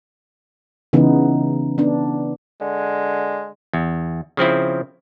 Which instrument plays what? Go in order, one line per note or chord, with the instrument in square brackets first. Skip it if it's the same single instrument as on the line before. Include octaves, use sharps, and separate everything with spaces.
[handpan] C#3 E3 B3 D#4
B3 D4
[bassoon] D3 [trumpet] G#3
[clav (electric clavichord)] E2
C#3 F3 C4 E4